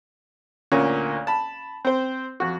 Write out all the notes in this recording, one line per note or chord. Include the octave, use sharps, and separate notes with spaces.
D2 A#2 A#3 C#4
A5 B5
C4 C5
F2 F#4